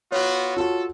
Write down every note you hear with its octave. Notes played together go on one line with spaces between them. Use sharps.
B3 F4 F#4 C#5
F4 F#4 A4